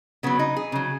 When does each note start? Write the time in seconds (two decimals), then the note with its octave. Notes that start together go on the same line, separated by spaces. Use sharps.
0.23 C#3 F#3 B3
0.39 D#4
0.56 G#4
0.72 C#3 F#3